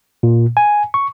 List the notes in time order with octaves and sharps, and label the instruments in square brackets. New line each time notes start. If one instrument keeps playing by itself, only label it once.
[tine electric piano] A#2
G#5
C#6